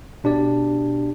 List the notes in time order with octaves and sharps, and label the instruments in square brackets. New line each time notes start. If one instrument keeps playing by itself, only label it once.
[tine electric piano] B2 D4 G4 D5